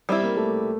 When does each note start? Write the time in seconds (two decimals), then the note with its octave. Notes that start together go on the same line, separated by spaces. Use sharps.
0.09 G3 C4 E4
0.22 A#3
0.37 A3